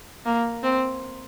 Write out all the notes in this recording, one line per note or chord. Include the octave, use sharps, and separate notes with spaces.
A#3
C4